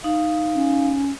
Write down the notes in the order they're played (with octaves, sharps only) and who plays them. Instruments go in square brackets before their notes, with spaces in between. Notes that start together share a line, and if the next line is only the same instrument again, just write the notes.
[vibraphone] D#4 F5
[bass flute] C#4